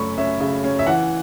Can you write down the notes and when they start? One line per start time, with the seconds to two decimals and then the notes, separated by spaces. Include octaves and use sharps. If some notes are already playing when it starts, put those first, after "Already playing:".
Already playing: F#2 A3 C#4 B5 C#6
0.18 C#4 E5
0.40 C#3
0.64 C#4
0.79 E5
0.87 E3 F#5